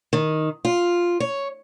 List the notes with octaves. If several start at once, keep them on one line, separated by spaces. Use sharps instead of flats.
D#3
F4
C#5